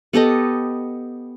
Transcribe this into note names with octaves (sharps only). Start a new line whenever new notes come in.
B3 G4 A4 D#5